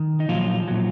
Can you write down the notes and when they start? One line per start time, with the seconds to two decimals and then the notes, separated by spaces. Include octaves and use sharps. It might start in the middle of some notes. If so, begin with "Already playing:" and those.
Already playing: D#3
0.20 D#4
0.29 A#2 F3 F#3 F4
0.68 A#2 F#3